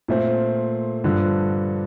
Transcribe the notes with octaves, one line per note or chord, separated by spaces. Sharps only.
A#2 A3 C4
G2 D3 F3